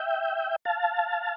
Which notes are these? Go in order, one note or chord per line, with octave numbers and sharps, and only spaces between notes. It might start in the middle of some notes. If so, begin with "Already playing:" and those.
Already playing: E5 G5
F5 A5